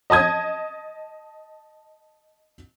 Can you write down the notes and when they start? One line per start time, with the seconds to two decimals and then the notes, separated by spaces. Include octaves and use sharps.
0.10 D#5 A5 D#6 G#6